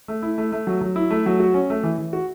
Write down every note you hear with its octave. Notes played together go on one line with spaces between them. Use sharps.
A3
E4
A3
A3
F#3
F#3
E4
A3
F#3
F#4
C#4
A3
E3
E3
F#4